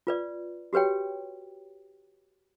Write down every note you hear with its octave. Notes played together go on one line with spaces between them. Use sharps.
F4 B4 D5
F#4 G4 B4 C#5 G5